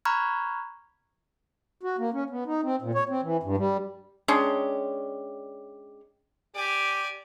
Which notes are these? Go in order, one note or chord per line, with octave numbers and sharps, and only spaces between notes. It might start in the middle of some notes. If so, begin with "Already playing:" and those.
A#5 B5 C#6 F6 F#6 G#6
F#4
A#3
C#4
B3
D#4
C4
A#2
C#5
C4
E3
G2
G3
G#3 C#4 D4 G4
G4 D5 G#5